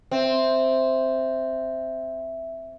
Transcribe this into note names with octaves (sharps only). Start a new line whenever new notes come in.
C4 E5